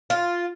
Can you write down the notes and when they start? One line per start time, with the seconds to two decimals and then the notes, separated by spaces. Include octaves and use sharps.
0.10 F4